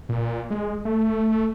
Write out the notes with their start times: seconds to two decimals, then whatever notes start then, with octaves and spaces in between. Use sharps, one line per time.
0.09 A#2
0.50 G#3
0.85 A3